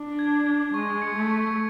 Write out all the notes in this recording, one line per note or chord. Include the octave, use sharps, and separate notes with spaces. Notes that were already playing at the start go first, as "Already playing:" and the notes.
Already playing: D4
G#6
G#6
G#3 C#6
C#7
A3
C#6